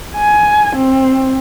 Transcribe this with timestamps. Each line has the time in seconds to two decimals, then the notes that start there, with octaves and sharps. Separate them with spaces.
0.16 G#5
0.76 C4